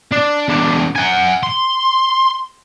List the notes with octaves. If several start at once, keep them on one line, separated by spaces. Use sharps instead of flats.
D4
E2 D4
F#5 G#5
C6